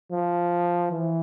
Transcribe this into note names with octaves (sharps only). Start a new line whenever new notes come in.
F3
E3